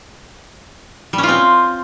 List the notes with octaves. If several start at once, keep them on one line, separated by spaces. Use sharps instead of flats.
G3
C#4
F4
C4